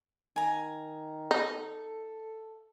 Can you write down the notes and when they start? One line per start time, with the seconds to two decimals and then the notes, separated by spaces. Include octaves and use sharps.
0.36 D#3 G#5 A#5
1.31 D#4 A4